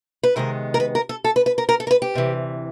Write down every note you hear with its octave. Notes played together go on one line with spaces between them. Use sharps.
B4
C3 D#3 G#3 B3 A#4
A#4
B4
A#4
A4
A4
B4
B4
A#4
A#4
A4
A#4
B4
G4
D2 C3 E3